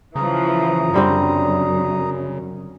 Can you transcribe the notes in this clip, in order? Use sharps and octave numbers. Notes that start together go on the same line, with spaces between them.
C#3 E3 F3 A#5 D#6
F#2 D3 G3 C4